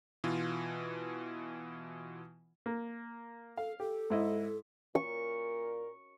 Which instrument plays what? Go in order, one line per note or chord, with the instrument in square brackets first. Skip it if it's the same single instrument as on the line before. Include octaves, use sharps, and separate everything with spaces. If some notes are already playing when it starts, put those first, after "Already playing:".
[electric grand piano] B2 E3 F4
[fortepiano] A#3
[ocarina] A4 [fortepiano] F5
[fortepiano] G4 [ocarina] A4
[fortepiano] G#2 E4 D#5
[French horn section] A#2 A#4 [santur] C#6